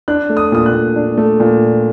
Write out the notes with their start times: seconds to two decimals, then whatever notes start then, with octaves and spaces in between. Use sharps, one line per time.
0.08 D4 F#6
0.29 A3
0.37 D#6
0.52 A#2 D#6
0.66 F#6
0.73 A#2
0.96 D4
1.17 A3
1.40 A#2